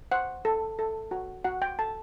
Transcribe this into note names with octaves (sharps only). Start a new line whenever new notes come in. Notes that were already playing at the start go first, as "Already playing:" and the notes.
C5 F#5
A4
A4
F#4
F#4 F#5
G5
A4 A5